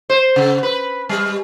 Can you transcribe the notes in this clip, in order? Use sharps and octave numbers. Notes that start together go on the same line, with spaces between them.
C5
C#3
B4
G3